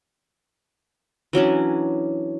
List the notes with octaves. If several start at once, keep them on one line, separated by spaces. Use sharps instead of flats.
E3 F#3 C#4 D4